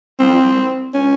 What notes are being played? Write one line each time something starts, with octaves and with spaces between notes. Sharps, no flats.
C4
C#4